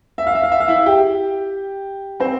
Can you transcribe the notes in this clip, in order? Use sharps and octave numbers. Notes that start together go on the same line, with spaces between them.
E5
F5
E5
F5
E5
F5
E4 E5
G4 G5
C4 C5